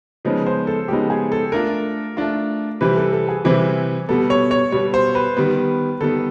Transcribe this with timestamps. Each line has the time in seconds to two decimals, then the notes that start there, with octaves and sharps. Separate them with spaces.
0.25 C#3 F3 G#3 B3 D#4
0.46 C5
0.67 A4
0.88 C#3 F3 G#3 B3 D#4 G4
1.10 G#4
1.32 A4
1.52 A3 D4 F4 A#4
2.17 A3 D4 F4
2.81 C3 E3 G3 C4 B4
2.97 A4
3.13 A4
3.29 G#4
3.45 C3 E3 G3 C4
4.09 B2 G3 B3 A4
4.30 C#5
4.51 C#5
4.72 B2 G3 B3 C#5
4.94 C5
5.15 B4
5.37 D#3 G3 B3
6.01 D#3 G3 B3 A4